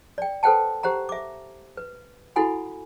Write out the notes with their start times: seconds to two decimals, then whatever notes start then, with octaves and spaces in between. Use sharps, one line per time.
0.18 D5 G5
0.43 A4 B4 C5 F#5 G5 A5
0.83 G4 C5 F#5 A#5
1.09 E5 D6
1.77 B4
2.36 E4 F#4 A4 F#5 G#5 B5